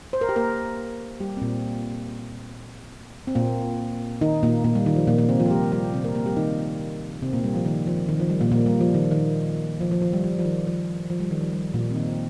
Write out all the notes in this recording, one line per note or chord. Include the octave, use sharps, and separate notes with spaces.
C5
A#4
G4
A#3 A#4
G3 G4
C4
A#2 A#3
C4
A#2 A#3
D#3 D#4
A#2 A#3
A#2 A#3
G3
D#3
F3
A#2 A#3
A#2 A#3
C3 C4
F3 F4
A#4
G3 G4
G3 G4
C3 C4
A#3 A#4
A#3 A#4
G3 G4
D#3 D#4
C3 C4
A#2 A#3
G3
F3
D#3
F3
D#3
F3
G3
A#2 A#3
A#2 A#3
G3
F3
D#3
D#3
F3
F3
F3
G3
F3
F3
D#3
F3
F3
G3
D#3
F3
G3
A#2 A#3
C4
D#3 D#4